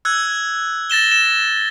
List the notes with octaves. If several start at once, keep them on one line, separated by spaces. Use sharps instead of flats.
E6 F#6 G#6
A6 A#6 E7 G7
E7